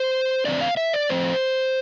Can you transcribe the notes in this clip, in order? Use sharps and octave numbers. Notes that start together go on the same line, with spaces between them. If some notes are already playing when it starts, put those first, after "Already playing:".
Already playing: C5
F2 D3 A3 C4 D5
F5
E5
D5
A2 F3 C4 C5